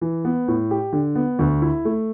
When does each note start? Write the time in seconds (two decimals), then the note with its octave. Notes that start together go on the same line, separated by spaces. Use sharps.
0.01 E3
0.25 B3
0.48 A2
0.71 G4
0.93 D3
1.15 B3
1.39 D2
1.62 E4
1.85 A3